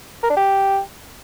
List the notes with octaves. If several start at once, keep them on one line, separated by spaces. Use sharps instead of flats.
A#4
D4
G4